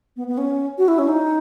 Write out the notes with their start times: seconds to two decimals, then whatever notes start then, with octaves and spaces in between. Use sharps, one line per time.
0.16 B3
0.27 B3
0.38 C#4
0.78 F#4
0.88 E4
0.99 C#4
1.08 D#4